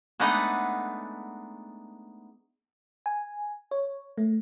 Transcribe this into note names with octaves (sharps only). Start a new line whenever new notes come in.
G#3 A3 B3 D4 D#4 F#5
G#5
C#5
A3